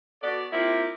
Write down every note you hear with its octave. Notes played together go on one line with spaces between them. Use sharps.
B3 F#4 A4 D5
A#3 C4 E4 F4 G4